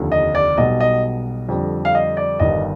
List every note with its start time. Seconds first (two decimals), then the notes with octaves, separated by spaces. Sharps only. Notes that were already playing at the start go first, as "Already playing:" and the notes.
Already playing: F1 D#2 D3 F3
0.12 D#5
0.35 D5
0.57 B1 B2 G3 D#5
0.81 D#5
1.48 F2 D3 G3
1.85 F5
1.95 D#5
2.17 D5
2.40 G1 G2 D#3 G3 D#5